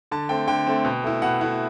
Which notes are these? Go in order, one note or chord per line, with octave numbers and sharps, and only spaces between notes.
D3 A5
A3 C4 G5
D3 G5
A3 C4
B2
A3 E4
B2 F#5
A3 E4